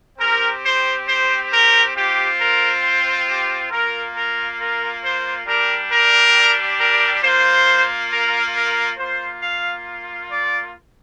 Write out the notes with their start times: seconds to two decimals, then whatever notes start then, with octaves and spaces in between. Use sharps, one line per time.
0.19 C4 G4 A#4
0.64 C5
1.06 C5
1.51 A#4
1.95 C4 F4 G4
2.38 A#4
2.82 C5
3.26 G4
3.70 A#3 F4 A#4
4.14 A#4
4.59 A#4
5.02 C5
5.46 G3 D4 G4 A#4
5.90 A#4
6.78 A#4
7.21 A#3 F4 C5
8.10 A#4
8.53 A#4
8.97 A#3 F4 C5
9.41 F5
10.29 D5